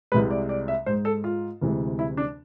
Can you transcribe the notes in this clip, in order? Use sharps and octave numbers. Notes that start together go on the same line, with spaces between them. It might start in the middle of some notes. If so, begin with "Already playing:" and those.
C2 C3 G#3 B4
D5
D5
E5
G#2 G#3 C5
A4
F4
D2 C3 E3 G#3
E4
D4